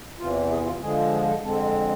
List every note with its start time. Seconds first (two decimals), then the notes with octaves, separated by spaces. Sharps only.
0.19 E2 C3 E3 F4
0.50 G#4
0.66 F4
0.82 D3 F3 G#3 G#4
1.12 G#4
1.28 A4
1.43 F2 D3 G#3 C4 A4